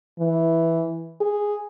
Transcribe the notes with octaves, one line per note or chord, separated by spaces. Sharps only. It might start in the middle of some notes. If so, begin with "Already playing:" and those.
E3
G#4